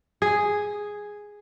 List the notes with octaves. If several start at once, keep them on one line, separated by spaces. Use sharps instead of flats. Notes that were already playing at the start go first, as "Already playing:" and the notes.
G#4